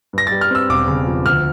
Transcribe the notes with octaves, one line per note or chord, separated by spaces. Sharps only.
G2 A#6
A6
G3
F6
C4 E6
E1 D6
C#3
F3
D2 F6